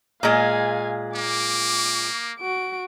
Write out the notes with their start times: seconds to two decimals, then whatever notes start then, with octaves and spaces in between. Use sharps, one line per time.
0.23 A#2 G#3 F5 G#5
1.16 A#3 D6
2.40 F#4 D7